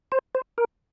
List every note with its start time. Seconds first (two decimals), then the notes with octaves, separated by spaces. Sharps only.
0.12 C5
0.35 C5
0.58 A#4